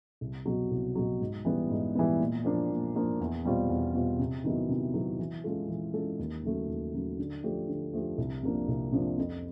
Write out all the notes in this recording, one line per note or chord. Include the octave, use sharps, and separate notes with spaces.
C2
B2 F#3
C2
B2 F#3
G#2
E3 G3 B3
G#2
E3 G3 B3
A#2
F3 A#3 D4
A#2
F3 A#3 D4
E2
B2 G3 C4 F4
E2
B2 G3 C4 F4
C3
D#3 F#3 B3 E4
C3
D#3 F#3 B3 E4
E3
G#3 C#4 F4 A4
E3
G#3 C#4 F4 A4
D#2
C#3 F#3 A3
D#2
C#3 F#3 A3
D3
F3 A3 D4 G4
D3
F3 A3 D4 G4
C2
C3 F3 A#3 D4
C2
C3 F3 A#3 D4
F2